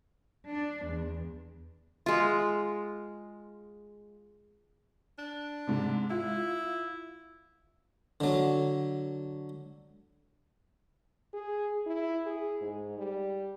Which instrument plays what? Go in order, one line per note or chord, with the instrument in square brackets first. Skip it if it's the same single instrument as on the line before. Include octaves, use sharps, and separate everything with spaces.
[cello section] D4
E2
[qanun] G#3 F4
[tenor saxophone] D4
[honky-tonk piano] G#2 C3
[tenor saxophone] E4 [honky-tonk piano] F4
[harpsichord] D3 F#3
[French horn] G#4
E4
G#4
G#2
G3